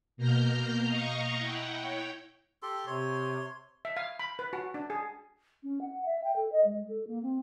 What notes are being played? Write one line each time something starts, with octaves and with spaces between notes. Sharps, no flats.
B2 A#3 A#5 F6 G6
D#5 F5 A#5 C#6
E4 F#5 G5
C#5 G5
G4 A4 C6
C3 C#5 C6
E5
F5
B5
B4
F#4
D4
G#4
C#4
F#5
E5
G5
A4
D#5
G#3
A4
A#3
C4